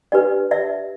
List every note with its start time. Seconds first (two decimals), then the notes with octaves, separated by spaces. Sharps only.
0.12 D4 G4 B4 D5
0.51 D5 E5